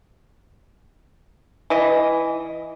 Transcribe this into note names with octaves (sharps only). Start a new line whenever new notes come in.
E3 D#5